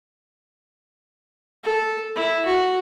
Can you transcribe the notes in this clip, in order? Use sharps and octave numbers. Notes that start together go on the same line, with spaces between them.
A4
E4
F#4